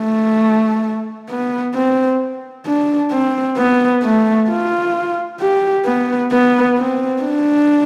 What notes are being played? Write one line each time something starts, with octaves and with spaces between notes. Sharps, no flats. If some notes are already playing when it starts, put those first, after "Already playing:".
Already playing: A3
B3
C4
D4
C4
B3
A3
F4
G4
B3
B3
C4
D4